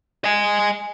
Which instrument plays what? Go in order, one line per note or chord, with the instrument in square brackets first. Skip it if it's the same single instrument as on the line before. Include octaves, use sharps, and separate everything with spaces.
[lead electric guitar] D#5 G#5